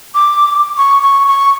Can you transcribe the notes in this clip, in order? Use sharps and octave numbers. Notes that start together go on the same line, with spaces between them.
D6
C#6
C#6
C#6